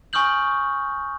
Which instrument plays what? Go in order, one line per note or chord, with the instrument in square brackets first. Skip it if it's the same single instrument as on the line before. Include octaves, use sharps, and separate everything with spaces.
[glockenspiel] G#5 C#6 D#6 F6 G6 F#7